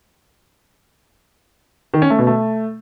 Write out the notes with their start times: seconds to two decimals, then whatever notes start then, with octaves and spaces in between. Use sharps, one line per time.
1.94 D#3
2.02 C#4
2.10 A3
2.19 B2
2.27 A3